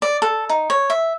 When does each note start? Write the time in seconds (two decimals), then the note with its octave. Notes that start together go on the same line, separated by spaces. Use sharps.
0.02 D5
0.22 A4
0.49 D#4
0.70 C#5
0.90 E5